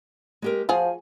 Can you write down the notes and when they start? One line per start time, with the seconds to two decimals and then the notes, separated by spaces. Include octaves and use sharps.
0.42 G#3 G4 A#4
0.69 F3 F4 F#4 G#4 G#5